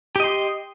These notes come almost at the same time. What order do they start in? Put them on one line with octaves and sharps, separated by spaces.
G4 D#5 C6